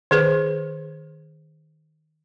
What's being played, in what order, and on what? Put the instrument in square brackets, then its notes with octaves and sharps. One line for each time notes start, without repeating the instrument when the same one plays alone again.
[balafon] D#3 G#4 B4